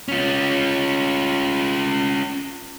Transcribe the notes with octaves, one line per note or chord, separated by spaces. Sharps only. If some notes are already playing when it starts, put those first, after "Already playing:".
C#4 F4